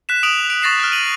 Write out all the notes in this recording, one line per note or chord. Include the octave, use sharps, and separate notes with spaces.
F#6 B6 E7
D#6 D7 F7 F#7
D7
C#6 A6 A#6 C7 E7
F6 F#6
D#7 F#7